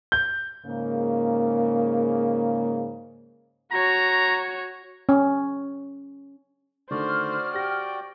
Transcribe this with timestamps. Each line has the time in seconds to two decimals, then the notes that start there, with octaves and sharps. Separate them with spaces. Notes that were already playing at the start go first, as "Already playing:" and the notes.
0.12 G6
0.66 G#2 C#3 A#3
3.72 F#4 C#5 A#5
5.09 C#4
6.91 D3 D#3 A3 F#4 C5 D5 F6
7.54 G4 G5 A#6